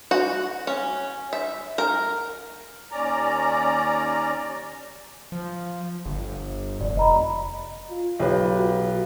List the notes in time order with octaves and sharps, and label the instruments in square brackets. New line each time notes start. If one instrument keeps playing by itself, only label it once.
[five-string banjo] F#4
C#4
E5
A#4
[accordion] D#2 C#4 D5 A#5
[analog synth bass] F3
G1
[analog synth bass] F1 [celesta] D5
[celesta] D#5 A#5 B5
[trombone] F4
[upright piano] B1 G4 B4
[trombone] F#4